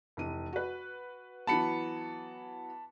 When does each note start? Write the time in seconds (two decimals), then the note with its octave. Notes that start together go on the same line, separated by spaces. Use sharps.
0.17 F1 E3 D#7
0.53 F#4 B4
1.47 E3 F#3 B3 A5 B5 C#7